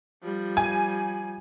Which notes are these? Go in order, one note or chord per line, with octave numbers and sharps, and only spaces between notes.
F3 G3
G#5